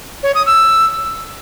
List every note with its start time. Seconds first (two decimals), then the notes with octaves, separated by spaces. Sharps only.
0.23 C#5
0.35 D#6
0.46 E6